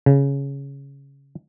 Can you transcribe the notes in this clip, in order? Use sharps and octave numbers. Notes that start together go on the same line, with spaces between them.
C#3